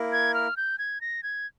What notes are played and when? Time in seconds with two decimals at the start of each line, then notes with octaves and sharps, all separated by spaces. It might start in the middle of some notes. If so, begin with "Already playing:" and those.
Already playing: A#3 E4 A#4
0.12 G#6
0.34 F6
0.57 G6
0.78 G#6
1.01 A#6
1.23 G#6